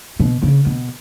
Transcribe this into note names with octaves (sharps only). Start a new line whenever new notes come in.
B2
C#3
B2